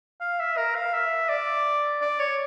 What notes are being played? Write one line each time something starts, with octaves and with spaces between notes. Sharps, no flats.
F5
E5
A#4
F5
E5
D5
D5
C#5